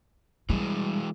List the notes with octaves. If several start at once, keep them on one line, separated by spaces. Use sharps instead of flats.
E3 G3 G#3